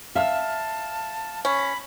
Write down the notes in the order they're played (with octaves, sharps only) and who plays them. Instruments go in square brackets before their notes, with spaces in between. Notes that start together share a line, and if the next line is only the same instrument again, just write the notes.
[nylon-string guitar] E5 [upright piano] F5 F6 [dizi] A5
[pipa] C#4 [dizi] B5